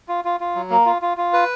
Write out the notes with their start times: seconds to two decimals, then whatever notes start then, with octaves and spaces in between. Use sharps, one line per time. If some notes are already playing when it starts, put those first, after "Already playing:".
0.08 F4
0.24 F4
0.40 F4
0.55 F#3
0.70 A#3
0.86 F4
1.02 F4
1.17 F4
1.33 B4